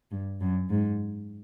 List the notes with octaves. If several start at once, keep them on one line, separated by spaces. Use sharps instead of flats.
G2
F#2
G#2